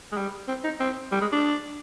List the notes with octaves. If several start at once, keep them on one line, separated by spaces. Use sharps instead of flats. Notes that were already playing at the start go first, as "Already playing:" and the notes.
G#3
G3
C4
D#4
C4
G3
G#3
D4